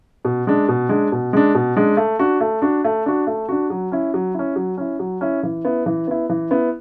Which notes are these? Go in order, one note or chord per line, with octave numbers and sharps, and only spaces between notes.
B2
G#3 D4
B2
G#3 D4
B2
G#3 D4
B2
G#3 D4
A3
D4 F#4
A3
D4 F#4
A3
D4 F#4
A3
D4 F#4
F#3
C#4 E4
F#3
C#4 E4
F#3
C#4 E4
F#3
C#4 E4
E3
B3 E4
E3
B3 E4
E3
B3 E4